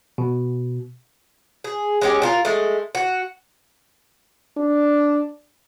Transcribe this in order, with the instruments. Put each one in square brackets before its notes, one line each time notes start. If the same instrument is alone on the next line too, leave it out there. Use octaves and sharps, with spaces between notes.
[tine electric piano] B2
[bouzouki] G#4
G#3 C#4 G4
D4 F4 A#4
G#3 A3
F#4
[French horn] D4